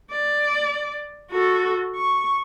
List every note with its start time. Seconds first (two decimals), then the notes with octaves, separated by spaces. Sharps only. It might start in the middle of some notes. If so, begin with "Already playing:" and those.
0.11 D5
1.31 F#4 A4
1.95 C#6